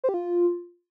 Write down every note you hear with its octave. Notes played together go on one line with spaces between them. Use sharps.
C5
G4
F4